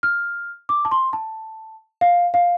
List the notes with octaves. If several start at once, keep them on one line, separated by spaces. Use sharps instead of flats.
F6
D6
A5
C6
A5
F5
F5